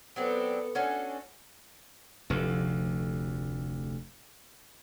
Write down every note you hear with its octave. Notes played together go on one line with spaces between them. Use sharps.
F#3 B3 C4 D4 A4
C#4 D4 F#4 A4
F1 D2